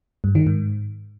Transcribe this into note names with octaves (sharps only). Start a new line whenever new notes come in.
G2
D#3
G#2